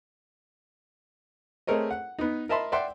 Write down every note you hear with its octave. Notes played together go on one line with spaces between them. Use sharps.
A3 C4 G#4 A#4 C#5 D#5
F#5
B3 D#4
A#4 D#5 E5 A5 B5 C6
D5 E5 F#5 G5 C6